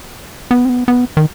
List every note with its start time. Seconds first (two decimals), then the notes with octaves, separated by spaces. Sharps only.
0.51 B3
0.65 C4
0.69 B3
0.88 B3
1.17 D#3